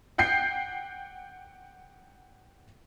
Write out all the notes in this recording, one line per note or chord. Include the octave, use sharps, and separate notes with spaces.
F#5 G5 G6 C7